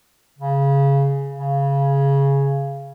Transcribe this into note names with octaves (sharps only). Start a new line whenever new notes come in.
C#3
C#3